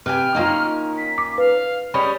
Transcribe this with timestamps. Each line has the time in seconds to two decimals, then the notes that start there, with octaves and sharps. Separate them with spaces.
0.06 C3 B4 G5 G#5 F6
0.35 D#3 A#3 C#4 D#4 F4
0.98 B6
1.18 D6
1.38 B4 F5
1.94 G3 G#3 C#4 B5 D#6